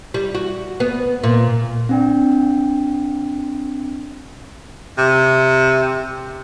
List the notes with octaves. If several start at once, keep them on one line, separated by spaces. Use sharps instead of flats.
G3
F#4
B3
A#2
C4 D4 G5
C3